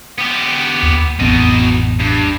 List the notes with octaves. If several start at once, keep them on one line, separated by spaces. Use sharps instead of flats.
B3 G4
D#2
A1 F2 B2 B3 D#4
G2